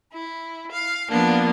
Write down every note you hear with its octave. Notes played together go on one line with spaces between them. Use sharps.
E4
F5
F3 A#3 B3 D4